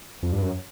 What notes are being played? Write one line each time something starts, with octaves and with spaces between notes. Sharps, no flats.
F2
G2
F#2